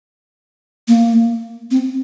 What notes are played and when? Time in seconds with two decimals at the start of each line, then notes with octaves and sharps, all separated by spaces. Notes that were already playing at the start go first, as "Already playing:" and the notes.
0.88 A#3
1.71 C4